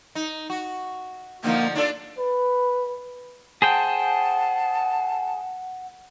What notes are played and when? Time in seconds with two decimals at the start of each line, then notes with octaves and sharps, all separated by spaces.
0.15 D#4
0.50 F#4
1.44 D3 F3 A#3 D#4
1.76 D4 F4 A4 D5
2.19 B4
3.62 G#4 C5 F#5 G5 A5